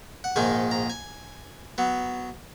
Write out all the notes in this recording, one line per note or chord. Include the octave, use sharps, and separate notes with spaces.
F#5
A#1 G#2 D#3 G#3 D#4 G#5
A#5
G#5
F#3 B3